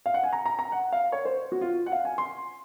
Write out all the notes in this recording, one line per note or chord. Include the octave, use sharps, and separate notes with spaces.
F5
F#5
G#5
A#5
A#5
A#5
F#5
F5
C#5
C5
F#4
F4
F#5
F5
G#5
C6